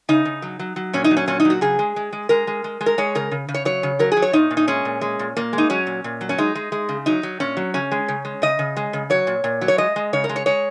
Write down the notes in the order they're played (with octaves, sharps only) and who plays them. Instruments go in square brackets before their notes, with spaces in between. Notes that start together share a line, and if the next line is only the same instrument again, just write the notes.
[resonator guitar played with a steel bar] C#3 D#4
C#3
F#3
F#3
F#3
A#2 C#4
D#4
F#3
C#4
A#2 C#4
D#4
F#3
F#4
C#3 G#4
G#3
G#3
G#3
G#3 A#4
G#3
G#3
G#3
A#4
G#3 C#5
C#3 A#4
C#3
C#3
C#5
F#3 C#5
C#3
F#3 A#4
G#4
F#3
C#5
A#2 D#4
A#2
D#4
G#3 C#4
A#2
G#3
A#2
A#2 A#3
G#3
D#4
F#3 C#4
A#2
A#2
F#3
C#4
G#3 D#4
G#3
G#3
C#3
F#3 D#4
F#3
A#2 C#4
F#3
C#3 C#4
G#3
C#3
G#3
C#3 D#5
C#3
G#3
C#3
F#3 C#5
A#2
A#2
F#3
C#5
G#3 D#5
G#3
C#3 C#5
A#4
G#3
C#5
G#3 C#5